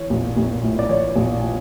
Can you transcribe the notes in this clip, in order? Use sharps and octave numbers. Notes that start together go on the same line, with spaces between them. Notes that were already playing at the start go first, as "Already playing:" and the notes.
Already playing: E3 C#5
A#1
A#1
A2
D5
E3 C#5
A#1